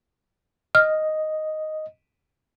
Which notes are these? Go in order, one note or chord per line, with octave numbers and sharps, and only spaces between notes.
D#5 F6